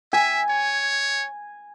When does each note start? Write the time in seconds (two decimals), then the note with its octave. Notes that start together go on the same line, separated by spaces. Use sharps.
0.13 E5 G#5
0.50 C#5